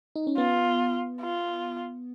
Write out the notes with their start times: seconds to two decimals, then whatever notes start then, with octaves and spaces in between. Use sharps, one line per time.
0.16 D#4
0.27 C#4
0.37 B3 F4
1.21 F4